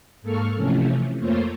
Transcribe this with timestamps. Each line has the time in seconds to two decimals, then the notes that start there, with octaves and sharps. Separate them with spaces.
0.22 G#2 A#3 A4 C#6 F6
0.56 C3 E3 F3 A3 C#4
1.20 F2 A3 A#3 F4 C5 C#5